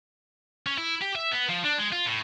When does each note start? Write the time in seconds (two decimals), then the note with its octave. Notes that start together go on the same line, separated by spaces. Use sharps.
0.66 C#4
0.78 E4
1.01 G4
1.15 E5
1.31 B3
1.49 F3
1.64 D4
1.78 G#3
1.92 F4
2.05 A2